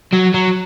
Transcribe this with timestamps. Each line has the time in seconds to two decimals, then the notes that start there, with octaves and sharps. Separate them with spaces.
0.13 F#3
0.34 F#3